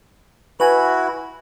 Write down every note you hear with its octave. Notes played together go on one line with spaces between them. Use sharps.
E4 F#4 B4 G#5